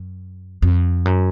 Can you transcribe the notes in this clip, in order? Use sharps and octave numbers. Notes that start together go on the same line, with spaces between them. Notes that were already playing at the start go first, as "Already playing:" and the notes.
Already playing: F#2
F2
F#2